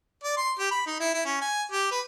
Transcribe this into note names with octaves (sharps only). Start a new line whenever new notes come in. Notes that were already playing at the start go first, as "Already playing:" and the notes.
D5
C6
G4
B5
D#4
E4
E4
C#4
G#5
G4
B4